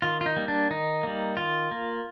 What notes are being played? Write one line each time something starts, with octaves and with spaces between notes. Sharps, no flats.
D#3 F4
F4
D#4
G3 A#3
D4
D#3 D#4
G3 A#3
D#3 F4
A#3